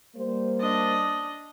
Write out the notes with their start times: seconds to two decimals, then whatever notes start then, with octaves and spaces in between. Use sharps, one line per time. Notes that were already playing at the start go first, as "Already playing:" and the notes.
0.16 G3 A#3 C5
0.60 D4 D#5